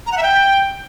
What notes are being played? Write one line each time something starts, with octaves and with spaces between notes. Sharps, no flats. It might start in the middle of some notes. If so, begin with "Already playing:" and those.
A#5
F#5
E5
G5